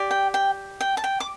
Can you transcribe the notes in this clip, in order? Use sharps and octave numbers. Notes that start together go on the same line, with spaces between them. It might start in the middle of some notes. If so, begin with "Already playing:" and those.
Already playing: G4 D5
G5
G5
G5
A5
G5
D6